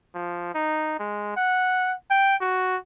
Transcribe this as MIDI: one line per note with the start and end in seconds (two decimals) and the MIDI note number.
0.15 0.52 53
0.55 0.97 63
0.99 1.34 56
1.36 1.94 78
2.11 2.36 79
2.41 2.77 66